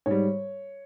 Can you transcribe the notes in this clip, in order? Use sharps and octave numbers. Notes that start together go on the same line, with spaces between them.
G#2 G3 C#5